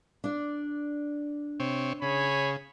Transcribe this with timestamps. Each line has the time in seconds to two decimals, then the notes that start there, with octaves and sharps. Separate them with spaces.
0.24 D4 D5
1.60 C3 C4 C#5
2.02 C#3 G#4 C#5 B5